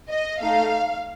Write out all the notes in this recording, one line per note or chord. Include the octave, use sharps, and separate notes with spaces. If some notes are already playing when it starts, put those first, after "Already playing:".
D#5
A3 D#4 A4 F5